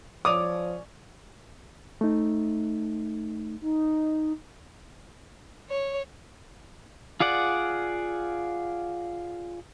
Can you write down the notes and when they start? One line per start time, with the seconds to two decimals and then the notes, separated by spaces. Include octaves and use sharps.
0.25 F3 C#4 C#5 D5 D6 D#6 F7
2.01 A3 D#4
3.62 D#4
5.69 C#5
7.20 F4 G#4 D5 F#5